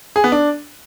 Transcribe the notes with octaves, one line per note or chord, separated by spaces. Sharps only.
G#4
B3
D4